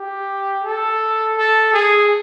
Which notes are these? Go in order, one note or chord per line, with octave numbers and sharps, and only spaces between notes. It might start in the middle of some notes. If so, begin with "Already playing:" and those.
Already playing: G4
A4
A4
G#4